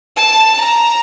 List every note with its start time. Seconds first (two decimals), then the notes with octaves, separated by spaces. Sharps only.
0.17 A5
0.60 A#5